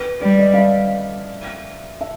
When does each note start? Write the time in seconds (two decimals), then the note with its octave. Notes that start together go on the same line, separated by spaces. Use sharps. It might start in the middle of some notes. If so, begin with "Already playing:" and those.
Already playing: B4
0.21 G3 D5
0.39 D#5
0.54 F5
0.58 E5
2.01 E5